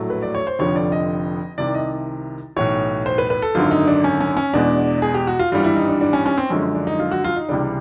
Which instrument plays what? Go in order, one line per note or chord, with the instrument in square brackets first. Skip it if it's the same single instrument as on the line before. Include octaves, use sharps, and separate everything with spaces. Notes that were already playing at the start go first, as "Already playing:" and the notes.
Already playing: [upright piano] A#1 A2 F#3 A3
B4
D5
C#5
C5
F1 F2 D3 F3 C#5
D5
D#5
C2 C3 D#3 D5
D#5
B1 A2 E3 C#5
C5
B4
B4
A4
G#1 F#2 D3 F4
D#4
D4
C#4
C#4
C#4
E2 B2 G#3 D4
G#4
G4
F#4
F4
G#1 G2 E3 G3 F4
E4
D#4
D4
D4
C#4
C#4
C4
F#2 D3 F3 G#3 C#4
D4
D#4
F4
F#4
F4
D#4
C#2 C3 E3 G3 D4